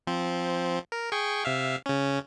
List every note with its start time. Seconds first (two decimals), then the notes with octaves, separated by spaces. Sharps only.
0.07 F3 C4
0.92 A#4
1.12 G#4 G5 C#6
1.45 C3 E5 F5
1.86 C#3 C#4